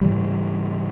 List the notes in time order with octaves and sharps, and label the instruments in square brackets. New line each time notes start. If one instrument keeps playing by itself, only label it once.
[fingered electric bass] G#2 C#3 E3 G3